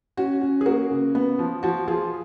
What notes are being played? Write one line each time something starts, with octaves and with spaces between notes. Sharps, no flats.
C#4 F#4
C#4
G#4
A#3 F#4
C#3
B3
F3
F3 F#4
F3 F4 G#4